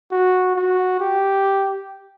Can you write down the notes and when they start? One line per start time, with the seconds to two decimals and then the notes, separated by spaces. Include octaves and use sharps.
0.11 F#4
0.56 F#4
1.00 G4